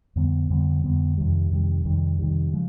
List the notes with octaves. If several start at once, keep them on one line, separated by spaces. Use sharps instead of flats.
F2 D3 G3 B3
F2 D3 G3 B3
F2 D3 G3 B3
F2 C3 D#3 G3
F2 C3 D#3 G3
F2 C3 D#3 G3
F2 C3 D#3 G3
C#3 F3 G#3